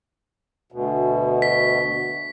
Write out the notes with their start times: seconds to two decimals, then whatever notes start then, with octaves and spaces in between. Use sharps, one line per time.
0.72 D2 B2
1.42 B6